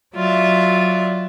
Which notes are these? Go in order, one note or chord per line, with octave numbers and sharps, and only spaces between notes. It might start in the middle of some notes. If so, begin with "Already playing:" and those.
F#3 F4 D5 E5